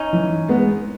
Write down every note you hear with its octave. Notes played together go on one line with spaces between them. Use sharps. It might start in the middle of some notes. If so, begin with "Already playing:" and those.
Already playing: C#4 D#4
E3
G#3 B3